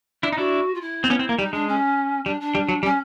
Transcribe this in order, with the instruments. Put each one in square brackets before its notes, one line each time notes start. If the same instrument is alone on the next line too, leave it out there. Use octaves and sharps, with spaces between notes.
[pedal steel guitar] D4 E4
D#4
[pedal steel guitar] D4 E4 [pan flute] F#4
[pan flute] F4
E4
[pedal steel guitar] C4
B3 C#4
C4
A#3
[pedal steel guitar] G3 [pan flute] D#4
[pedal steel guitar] G#3 [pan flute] D4
[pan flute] C#4
[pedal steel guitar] G3 [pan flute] D4
[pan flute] D4
[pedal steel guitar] G3
F#3
[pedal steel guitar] G3 [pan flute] C#4